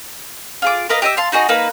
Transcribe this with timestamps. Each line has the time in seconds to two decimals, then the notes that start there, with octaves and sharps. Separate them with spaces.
0.62 F4 G#4 D6
0.89 A#4 B4 D#5 F5
1.02 G4 D#5 E5
1.17 F5 A5 C6
1.32 D#4 F#4 G#4 D#5
1.49 A#3 D#4 B4